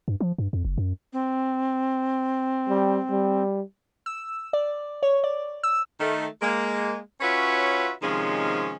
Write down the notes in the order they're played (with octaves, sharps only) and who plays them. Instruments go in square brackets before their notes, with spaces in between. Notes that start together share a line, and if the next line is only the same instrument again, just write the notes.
[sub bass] G2
F3
G2
F2
F#1
F#2
[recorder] C4
[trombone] G3
G3
[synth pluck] E6
D5
C#5
D5
E6
[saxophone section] D#3 A3
G#3 A#3
C#4 F4 F#4 B4 C#5 E5
C3 D#3 F3 G#3 C#4